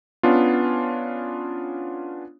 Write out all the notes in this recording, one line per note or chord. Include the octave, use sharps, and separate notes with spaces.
B3 C#4 D4 F4